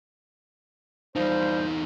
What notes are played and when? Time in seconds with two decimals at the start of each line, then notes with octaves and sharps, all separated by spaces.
1.16 E2 F3 G3 D#4 C5